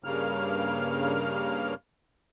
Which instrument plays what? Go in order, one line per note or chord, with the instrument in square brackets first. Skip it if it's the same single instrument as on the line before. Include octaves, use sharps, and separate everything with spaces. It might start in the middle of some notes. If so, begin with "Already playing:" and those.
[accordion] G2 C#3 A#3 F6